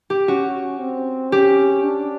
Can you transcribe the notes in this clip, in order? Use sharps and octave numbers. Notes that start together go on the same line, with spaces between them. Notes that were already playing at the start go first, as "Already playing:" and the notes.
G4
C#4 F#4
C4
C#4 G4
D4